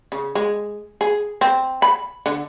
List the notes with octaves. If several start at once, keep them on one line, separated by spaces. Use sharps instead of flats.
C#3
G#3
G#4
C4
B5
D3